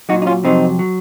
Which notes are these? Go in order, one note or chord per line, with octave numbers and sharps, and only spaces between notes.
A#2 F#3 D#4 F#4
D#4
C#4 F4
F2 C3 F#3 C4 D#4
F#3